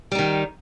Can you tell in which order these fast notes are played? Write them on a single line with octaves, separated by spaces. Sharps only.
G3 D#4 D#3